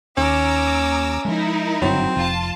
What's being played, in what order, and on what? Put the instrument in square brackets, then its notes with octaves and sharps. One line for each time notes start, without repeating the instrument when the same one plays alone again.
[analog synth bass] D#2 [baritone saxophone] C#4 [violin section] A#5 D6 E6
[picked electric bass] F3 G#3 [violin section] D#4 E4 A#4
[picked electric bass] F#1 G2 D3 [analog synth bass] F#3 [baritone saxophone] C4
[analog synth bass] F1 [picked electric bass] F3 [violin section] F4 A5